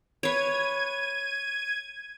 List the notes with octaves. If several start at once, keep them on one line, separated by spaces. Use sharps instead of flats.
B4 C#5 G#6 D#7